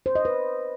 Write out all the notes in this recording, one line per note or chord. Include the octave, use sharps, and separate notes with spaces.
C5
D#5
B4